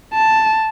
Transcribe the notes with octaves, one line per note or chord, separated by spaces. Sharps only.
A5